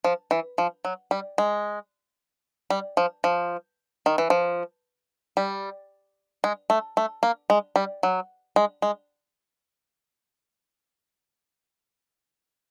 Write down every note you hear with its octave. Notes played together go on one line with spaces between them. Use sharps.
F3
E3
F3
F#3
G3
G#3
G3
F3
F3
D#3
E3
F3
G3
G#3
A3
A3
A#3
G#3
G3
F#3
G#3
G#3